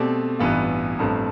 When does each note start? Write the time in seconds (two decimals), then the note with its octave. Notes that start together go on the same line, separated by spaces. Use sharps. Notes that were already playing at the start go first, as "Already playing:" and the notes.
Already playing: B2 A3 C4 G4 D5
0.39 A1 G2 E3 B3 F4
0.99 A1 G2 F3 A3 C4